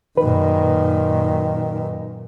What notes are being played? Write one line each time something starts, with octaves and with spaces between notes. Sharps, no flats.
F#2 A#2 D#3 B4